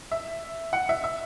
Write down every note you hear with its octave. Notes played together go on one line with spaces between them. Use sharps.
E5
F#5
E5
E5